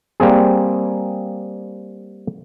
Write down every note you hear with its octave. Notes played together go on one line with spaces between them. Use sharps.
G3 A#3 C4 G#4